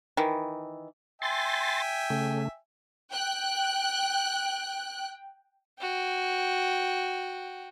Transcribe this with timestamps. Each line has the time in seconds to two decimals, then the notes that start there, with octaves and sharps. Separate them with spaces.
0.17 D#3 E3
1.22 E5 G5 G#5 C6 A6
2.10 C#3 A3
3.12 G5 F#6
5.80 F#4 G5